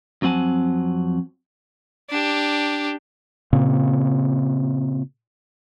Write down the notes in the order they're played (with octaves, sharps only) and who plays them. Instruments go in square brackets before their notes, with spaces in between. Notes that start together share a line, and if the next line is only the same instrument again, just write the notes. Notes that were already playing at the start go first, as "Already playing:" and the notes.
[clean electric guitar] F2 F#3 C4 F#5 G#5 A5
[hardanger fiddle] D4 G4
[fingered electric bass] A#2 C#3 A#3 C4